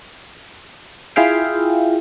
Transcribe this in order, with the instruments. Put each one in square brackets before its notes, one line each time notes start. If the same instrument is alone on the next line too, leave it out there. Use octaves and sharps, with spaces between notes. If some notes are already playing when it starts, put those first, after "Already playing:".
[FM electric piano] E4 F4 G#4 E5 F5 G5